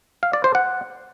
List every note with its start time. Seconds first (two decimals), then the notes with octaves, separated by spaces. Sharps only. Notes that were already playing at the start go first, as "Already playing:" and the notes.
0.23 F5
0.33 D5
0.44 C5
0.55 F#5